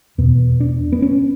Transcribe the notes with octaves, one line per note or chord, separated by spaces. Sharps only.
E2 B2 B3
D4
B3
C#4